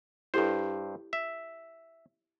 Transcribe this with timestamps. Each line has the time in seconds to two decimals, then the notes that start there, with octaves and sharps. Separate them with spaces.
0.34 G2 E4 G4 A4 C5
1.13 E5